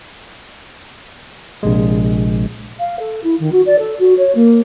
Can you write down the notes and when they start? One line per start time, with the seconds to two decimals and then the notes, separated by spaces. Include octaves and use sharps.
1.63 A#1 C3 G#3
2.79 F5
2.99 A4
3.23 E4
3.39 D#3
3.52 F#4
3.66 D5
3.78 A4
3.99 F#4
4.17 C#5
4.35 A#3